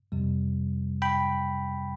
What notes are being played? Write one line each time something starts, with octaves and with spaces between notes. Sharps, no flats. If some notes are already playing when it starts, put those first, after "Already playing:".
F2 C3 G3
G5 B5